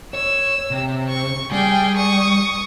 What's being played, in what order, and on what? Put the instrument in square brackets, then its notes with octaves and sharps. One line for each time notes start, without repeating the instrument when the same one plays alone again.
[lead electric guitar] C#5 [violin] E6
[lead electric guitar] C3
[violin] C#6
[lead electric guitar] G3 [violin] G#4 G5
[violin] C#6 D#6